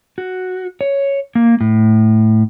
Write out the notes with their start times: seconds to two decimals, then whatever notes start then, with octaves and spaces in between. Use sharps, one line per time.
0.18 F#4
0.81 C#5
1.35 A#3
1.61 A2